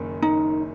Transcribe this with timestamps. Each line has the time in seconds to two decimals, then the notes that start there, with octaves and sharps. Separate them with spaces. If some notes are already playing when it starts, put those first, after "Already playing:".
Already playing: F#1 F#2 D#3
0.22 D#4